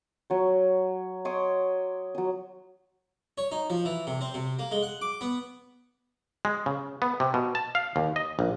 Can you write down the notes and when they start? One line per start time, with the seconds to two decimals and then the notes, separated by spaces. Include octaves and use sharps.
0.30 F#3 C#5
1.25 C#5 C6 D6 D#6
2.15 F#3 D#6
3.38 C#5
3.52 D#4
3.70 F3
3.85 E3
4.07 C3
4.21 C4
4.34 C3
4.59 A#3
4.71 G#3
4.83 F#5
5.01 D6
5.21 B3
6.45 G#3
6.66 C#3
7.02 B3
7.20 C3
7.34 B2
7.55 A5
7.75 F5
7.96 D#2
8.16 D#5
8.39 A#1